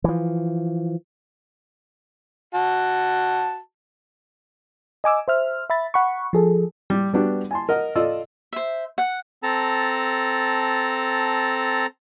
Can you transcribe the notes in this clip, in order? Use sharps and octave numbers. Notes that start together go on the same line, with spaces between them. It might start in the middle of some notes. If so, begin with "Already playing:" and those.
E3 F3
F#4 A5
D#5 G#5 D6 E6
C5 E5 F6
E5 B5 A6
F#5 B5 C#6
F3 G#4 A4
G3
G3 B3 D4 F#4 G4
G#5 A5 C6
A#4 D#5 F#5
F4 A4 D5 D#5 E6
C5 E5
F#5
C4 A4 A5 A#5